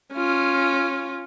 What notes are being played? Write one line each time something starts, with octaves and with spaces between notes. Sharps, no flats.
C#4 F4